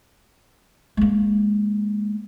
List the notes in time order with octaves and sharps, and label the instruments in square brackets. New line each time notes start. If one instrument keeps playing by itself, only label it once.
[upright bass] G#3 A#3